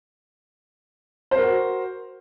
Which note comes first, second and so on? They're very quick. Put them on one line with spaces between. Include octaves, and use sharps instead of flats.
C5 A#4 F#4